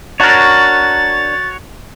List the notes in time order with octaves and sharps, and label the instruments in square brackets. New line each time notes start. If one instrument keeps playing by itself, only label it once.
[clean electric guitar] D4 A#4 [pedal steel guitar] F#4 C#5 [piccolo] A6